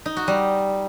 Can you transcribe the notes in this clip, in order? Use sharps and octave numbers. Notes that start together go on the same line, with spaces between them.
D#4
F#4
G3